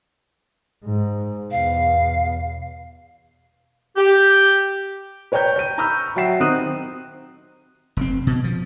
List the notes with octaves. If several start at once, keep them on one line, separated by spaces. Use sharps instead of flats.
G#2
E2 B2 F5
G4
B4 C#5 G5 A#5 G6
G6 D#7
A#5 B5 C#6 E6 F6 G6
F#3 F#4 E5 G5 C7 E7
D#3 C4 D#4 D#6 F#6 D#7
F1 C4
B2
F3